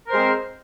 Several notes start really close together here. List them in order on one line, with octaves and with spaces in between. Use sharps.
A#4 C5 G#3 C4